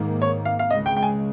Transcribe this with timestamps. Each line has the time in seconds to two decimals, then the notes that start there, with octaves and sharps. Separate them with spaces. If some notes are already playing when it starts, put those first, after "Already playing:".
Already playing: G#2 D#3 A#3
0.22 C#5
0.45 F5
0.59 F5
0.70 C#2 C#3 G#3 D#5
0.86 G5
0.97 G5
1.03 G#5